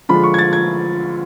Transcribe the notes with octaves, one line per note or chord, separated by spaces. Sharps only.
D3 F3 G#3 D4 F4 B5
C#6
G#6
A6
G#6